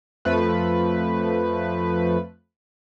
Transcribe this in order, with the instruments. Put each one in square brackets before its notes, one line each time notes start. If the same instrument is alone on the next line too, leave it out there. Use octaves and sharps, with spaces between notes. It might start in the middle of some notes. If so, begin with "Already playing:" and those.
[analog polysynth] F2 F3 A3 B4